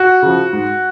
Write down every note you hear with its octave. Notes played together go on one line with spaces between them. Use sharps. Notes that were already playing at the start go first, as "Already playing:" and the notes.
Already playing: F#4
C#3 F3
G#2